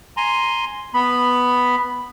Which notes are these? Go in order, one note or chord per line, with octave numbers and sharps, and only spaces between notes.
G#5 A#5 C6
B3 B5